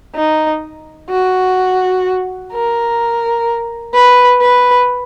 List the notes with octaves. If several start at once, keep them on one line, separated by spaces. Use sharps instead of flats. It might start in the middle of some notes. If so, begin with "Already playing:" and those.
D#4
F#4
A#4
B4
B4